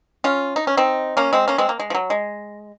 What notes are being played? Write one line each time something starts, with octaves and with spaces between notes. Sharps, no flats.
C#4 F4
D#4
C#4
C4 D#4
A#3 C#4
G#3 C4
A#3 C#4
G#3 C4
A#3
G#3
F3
F#3
G#3